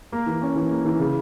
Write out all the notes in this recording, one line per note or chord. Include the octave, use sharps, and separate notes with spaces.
A#3
E3
C#4
E3
A#3
E3
C#3